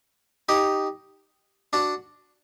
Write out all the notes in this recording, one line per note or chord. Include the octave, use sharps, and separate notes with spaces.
D#4 G4
D4 F#4